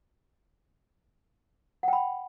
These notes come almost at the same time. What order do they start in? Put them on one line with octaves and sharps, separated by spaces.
F#5 G5 B5